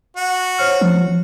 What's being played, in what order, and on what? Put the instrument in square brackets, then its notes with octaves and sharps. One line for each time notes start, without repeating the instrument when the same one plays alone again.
[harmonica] F#4
[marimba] C5 C#5 F6
[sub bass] F3